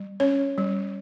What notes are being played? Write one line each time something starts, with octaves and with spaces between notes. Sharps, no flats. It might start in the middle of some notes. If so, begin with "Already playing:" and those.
Already playing: G3
C#4 C#5
G3